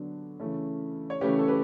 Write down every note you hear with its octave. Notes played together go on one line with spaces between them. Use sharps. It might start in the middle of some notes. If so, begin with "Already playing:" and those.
Already playing: D3 F#3 B3 D4
C#3 E3 A3 C#4
C#5
C#3 E3 A3 C#4 G4 B4
A4
G4 B4